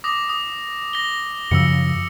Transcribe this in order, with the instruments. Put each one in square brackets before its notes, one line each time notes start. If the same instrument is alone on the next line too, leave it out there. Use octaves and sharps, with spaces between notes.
[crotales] D6 D#6 A#6
D#6
A#6 G7
[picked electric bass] F#2 C#3 F3 [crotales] E6 C#7